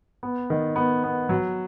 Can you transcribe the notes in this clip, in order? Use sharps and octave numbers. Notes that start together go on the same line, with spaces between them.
B3
D#3
B3
B3
F#3